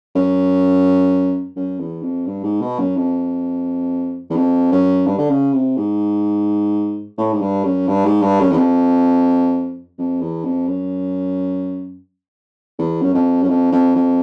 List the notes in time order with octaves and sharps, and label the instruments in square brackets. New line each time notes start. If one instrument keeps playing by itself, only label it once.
[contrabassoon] F#2
F#2
E2
F2
G2
G#2
B2
F#2
F2
E2
F2
F#2
G2
D3
C#3
C3
G#2
A2
G#2
G2
F#2
G2
G#2
G2
F#2
E2
F2
F2
E2
F2
F#2
E2
F#2
F2
F#2
F2
F2
F2